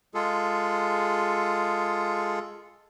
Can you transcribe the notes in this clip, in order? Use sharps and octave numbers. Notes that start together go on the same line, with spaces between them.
G#3 F4 G#4 A4